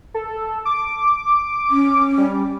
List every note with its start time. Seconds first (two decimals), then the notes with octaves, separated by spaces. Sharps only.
0.14 A4
0.65 D6
1.71 C#4
2.18 G3